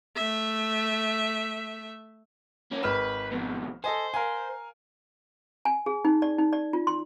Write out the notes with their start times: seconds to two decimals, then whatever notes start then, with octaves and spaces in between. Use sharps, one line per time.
0.16 A3 E5
2.72 A#3 C#4
2.83 G#1 B4 F6 E7
3.32 F2 B2
3.84 A4 C5 D#5 G#5
4.14 A#4 F5 G#5
5.65 G#5
5.86 G#4
6.05 D#4
6.22 D5
6.38 D#4
6.53 D5
6.73 F4
6.87 C6